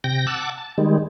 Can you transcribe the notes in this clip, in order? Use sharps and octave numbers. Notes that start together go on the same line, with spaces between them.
C3 G5 A#6
F#5 A5 D6 E6
A5
D#3 G3 G#3